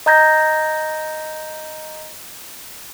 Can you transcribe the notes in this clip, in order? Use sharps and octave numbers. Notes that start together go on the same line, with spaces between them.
D#5 A#5 G6 G#6 A#6